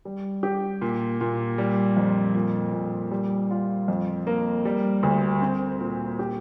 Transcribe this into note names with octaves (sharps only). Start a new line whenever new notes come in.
G3
G4
A#2
A#2
G3
F2
A#2
A#2
G3
F4
F2
A#3
G3
D2
C4
A#2
G4